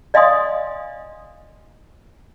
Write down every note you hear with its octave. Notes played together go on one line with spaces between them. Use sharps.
D5 D#5 F5 G#5 C6 D#6